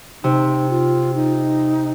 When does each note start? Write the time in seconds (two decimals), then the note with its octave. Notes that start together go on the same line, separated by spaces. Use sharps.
0.23 C3 D#4
0.69 F4
1.14 D#4